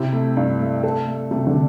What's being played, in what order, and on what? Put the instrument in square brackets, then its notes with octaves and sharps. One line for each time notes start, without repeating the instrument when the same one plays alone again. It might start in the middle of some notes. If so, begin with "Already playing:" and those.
Already playing: [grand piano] C3 [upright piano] C4 E4
[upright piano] A3
G2
A3
A4
A3
[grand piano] C3 [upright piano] A3
[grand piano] D3